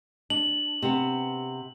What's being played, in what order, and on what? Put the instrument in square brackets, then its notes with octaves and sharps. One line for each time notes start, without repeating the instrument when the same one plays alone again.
[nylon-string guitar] D4 [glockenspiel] F#7
[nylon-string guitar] C3 B3